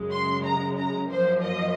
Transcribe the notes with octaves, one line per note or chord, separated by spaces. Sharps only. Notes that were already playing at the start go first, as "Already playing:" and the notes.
Already playing: F#2 C#3 G#3
C6
A#5
A#5
F#2 F3 A#3 C5
D#5